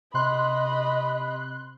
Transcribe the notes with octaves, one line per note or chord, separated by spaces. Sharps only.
C3 D#5 B5 C6 F#6